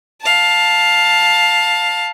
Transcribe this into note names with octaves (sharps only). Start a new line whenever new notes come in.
F5 A5